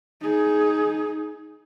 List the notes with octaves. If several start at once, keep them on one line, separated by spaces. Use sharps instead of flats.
D#4 G#4